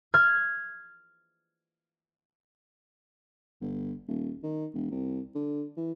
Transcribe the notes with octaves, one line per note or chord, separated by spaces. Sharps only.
F6 G#6
G1
D#1
D#3
E1
C2
D3
E3